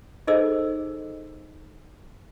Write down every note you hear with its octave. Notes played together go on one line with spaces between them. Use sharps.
D#4 G#4 A4 C5 D#5 E6